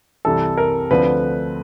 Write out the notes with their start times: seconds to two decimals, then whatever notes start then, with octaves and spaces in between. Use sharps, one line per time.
0.25 C2 C3 E3 A4
0.57 A#4
0.91 D2 D3 F3 A3 C4 B4